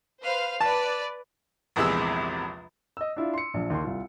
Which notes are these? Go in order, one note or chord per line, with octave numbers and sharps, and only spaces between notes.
B4 C5 F5
B4 D5 A5
A#1 E2 C3 G#3 E6
D#5 E6
D4 E4 F4
C6 C#7
A#1 F3
D#2 D#3 C6
C2 F4